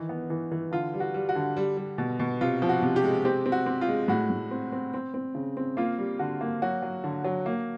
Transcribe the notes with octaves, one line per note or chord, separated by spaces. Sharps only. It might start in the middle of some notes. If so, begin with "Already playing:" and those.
Already playing: D#3 E3
B3
E3
E3
D3 F4
G3
F#4
G3
F#4
D3
G3
G3
B2
B2
C3 F4
F3
F#4
C3
G4
G#3
C4 G4
C4
F#4
C4
F4
G#3
A2 F#4
A2
C4
C4
C4
C4
C#3
C4
A#3 F4
G3
D3 F#4
A#3
F#3 F#4
F#3
D3
F#3
A#3